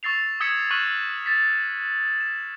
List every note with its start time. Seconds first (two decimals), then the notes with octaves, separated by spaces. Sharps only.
0.03 C#6 E6 A6 C7 F7
0.40 D#6 E6 G#6 B6 C#7 E7
0.71 C#6 F6 F#6 B6 D#7 F#7
1.26 A6 B6
2.20 E7